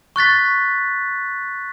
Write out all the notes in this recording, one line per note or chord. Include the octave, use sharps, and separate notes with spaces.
C#6 F#6 A6 B6